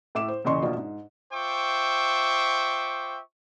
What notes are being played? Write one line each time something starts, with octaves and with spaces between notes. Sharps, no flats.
A2 E5 D6 E7
C5
E2 A#2 C#3 D#5 C6 C#6
A#1 B2 F4
G#2
F4 C5 E5 G5 C#6 D6